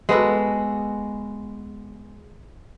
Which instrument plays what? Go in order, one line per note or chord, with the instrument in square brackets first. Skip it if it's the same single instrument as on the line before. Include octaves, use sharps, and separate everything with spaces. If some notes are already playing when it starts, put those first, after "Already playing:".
[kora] G#3 B3 F#4 A4